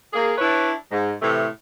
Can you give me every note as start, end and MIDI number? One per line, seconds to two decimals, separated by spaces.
0.13 0.33 58
0.13 0.33 68
0.38 0.71 62
0.38 0.71 64
0.38 0.71 71
0.38 0.71 73
0.92 1.11 44
1.21 1.45 45
1.21 1.45 48
1.21 1.45 52
1.21 1.45 57